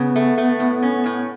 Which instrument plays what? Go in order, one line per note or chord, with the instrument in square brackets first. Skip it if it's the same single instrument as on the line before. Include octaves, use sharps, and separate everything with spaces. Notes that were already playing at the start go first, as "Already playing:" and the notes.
Already playing: [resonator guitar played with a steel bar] C#3 [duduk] B3
[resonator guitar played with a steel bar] A3
A3
A2
C#4
A2